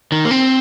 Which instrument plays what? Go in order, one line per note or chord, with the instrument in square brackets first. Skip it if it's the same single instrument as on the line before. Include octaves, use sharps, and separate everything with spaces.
[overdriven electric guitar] D#3
A#3
C4